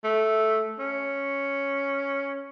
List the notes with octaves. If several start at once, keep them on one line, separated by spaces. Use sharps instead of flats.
A3
C#4